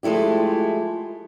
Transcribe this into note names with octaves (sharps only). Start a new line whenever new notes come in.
F3 G#3 A3 E4 G4